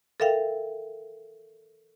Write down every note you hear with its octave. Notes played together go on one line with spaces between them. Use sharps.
A4 A#4 E5 F5 G5